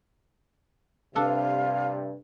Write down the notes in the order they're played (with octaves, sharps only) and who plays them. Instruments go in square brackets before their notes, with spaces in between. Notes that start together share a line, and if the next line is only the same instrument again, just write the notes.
[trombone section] G2 [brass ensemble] C3 [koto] D4 A4 [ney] F5